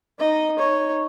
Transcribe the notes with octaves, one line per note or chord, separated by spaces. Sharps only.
D#4 D#5
D#4 C#5